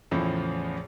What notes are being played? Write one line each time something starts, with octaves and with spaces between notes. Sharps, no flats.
E2 A2 C#3 F3